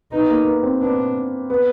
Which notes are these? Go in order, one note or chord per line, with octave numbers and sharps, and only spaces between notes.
B3 D#4
A#3
B3
C4
B3 D4
B3